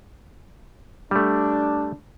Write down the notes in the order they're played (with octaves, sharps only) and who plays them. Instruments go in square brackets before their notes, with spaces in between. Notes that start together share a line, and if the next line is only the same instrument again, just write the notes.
[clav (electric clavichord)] G3 A3 [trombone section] D4